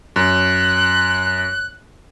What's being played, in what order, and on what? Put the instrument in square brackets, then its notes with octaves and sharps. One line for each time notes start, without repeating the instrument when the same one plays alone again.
[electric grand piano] F#2 [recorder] F#6